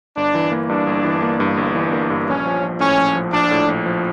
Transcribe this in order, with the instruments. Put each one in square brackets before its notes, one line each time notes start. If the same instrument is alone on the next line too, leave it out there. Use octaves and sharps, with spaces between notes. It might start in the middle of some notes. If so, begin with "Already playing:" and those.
[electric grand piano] G1 [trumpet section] D4
[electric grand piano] E3
A#3
[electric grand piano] G2 [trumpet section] D4
[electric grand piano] G1
E3
A#3
G2
G1
[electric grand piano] E3 [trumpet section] D4
[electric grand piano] A#3
G2
[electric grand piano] A#1 [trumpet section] C#4
[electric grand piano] F3
A#1
[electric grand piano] A2 [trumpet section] C#4
[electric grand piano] A#1
F3
[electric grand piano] A#1 [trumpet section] D4
[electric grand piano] A2
A#1
F3